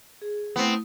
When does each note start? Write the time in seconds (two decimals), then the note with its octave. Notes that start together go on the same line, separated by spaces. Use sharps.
0.22 G#4
0.56 A3 B3 C4 E4 D#6